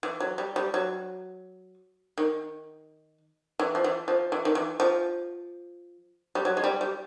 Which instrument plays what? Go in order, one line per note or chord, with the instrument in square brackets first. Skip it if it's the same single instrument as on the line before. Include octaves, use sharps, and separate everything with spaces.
[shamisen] E3
F#3
G3
G3
F#3
D#3
E3
F3
E3
F3
E3
D#3
E3
F3
G3
F#3
G#3
G3
G3